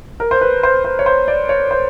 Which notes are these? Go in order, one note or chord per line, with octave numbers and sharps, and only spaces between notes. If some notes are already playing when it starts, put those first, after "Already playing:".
A#4
C5
B4
C5
C5
C#5
C5
D5
C#5
C5